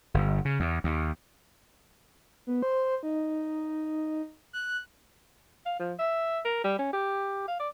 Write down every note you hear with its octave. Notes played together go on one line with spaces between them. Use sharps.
G1
C#3
E2
D#2
B3
C5
D#4
F#6
F5
F3
E5
A#4
G3
C#4
G4
F5
D5